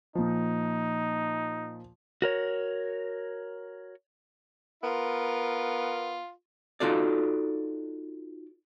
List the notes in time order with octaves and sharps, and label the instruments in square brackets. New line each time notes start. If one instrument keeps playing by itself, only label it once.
[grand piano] A#2 F3 [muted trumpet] D#4
[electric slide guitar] F#4 A#4 C#5
[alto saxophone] B3 [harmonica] F4 [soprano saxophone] A#4
[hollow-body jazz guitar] D#4 F4 F#4 A4 D5